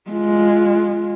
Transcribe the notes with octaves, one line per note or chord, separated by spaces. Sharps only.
G#3 F4